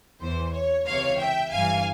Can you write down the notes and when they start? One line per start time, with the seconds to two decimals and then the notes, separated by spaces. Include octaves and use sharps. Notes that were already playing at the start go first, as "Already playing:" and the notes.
0.20 E2 E3 C5
0.54 C#5
0.86 C#2 C3 E3 C#5 F5
1.19 E5 G5
1.52 G1 G2 E3 F5 G#5